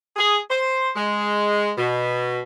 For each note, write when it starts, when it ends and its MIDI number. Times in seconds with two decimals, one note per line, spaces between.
0.16 0.39 68
0.50 0.90 72
0.95 1.71 56
1.78 2.41 47